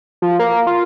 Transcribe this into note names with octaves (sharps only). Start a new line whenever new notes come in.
F3
A#3
F4